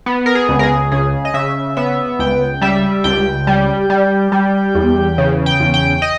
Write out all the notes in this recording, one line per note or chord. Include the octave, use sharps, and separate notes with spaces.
B3
A#4
G#4
C#2
A#4
G#4
C#3 G#4
D#5
C#3 E5
B3 E5
C#2 G5
G3 E5
C#2 G5
G3
G3
G3
E2
C#3
G5
E2
G5
D#5